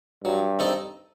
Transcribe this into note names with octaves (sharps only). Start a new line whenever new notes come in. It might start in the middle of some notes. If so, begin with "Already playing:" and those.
G2 F#3
C4 D#4 A4 D#5